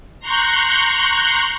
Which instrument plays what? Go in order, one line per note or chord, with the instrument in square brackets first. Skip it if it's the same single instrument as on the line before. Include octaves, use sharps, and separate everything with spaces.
[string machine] A#5 C6 C#6 F#6 G6